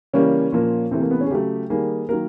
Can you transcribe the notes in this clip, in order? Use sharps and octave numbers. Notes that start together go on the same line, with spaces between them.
C#3 E3 G3 A#3 C#4
A#2 F3 A#3
C3 E3 A3 C4
A#3
B3
C#4
G#4
C#3 F#3 A3 G4
D#3 G3 A#3 G#4
D#3 F#3 A#3 A#4